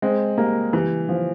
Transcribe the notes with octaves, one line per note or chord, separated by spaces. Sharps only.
G#3 C4
G3 A#3
E3 G3
F3